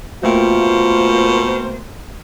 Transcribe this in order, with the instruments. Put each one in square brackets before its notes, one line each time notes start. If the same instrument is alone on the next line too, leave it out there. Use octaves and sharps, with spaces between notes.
[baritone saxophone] B2 [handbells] A3 A#3 G5 [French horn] F4 [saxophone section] A#4 C5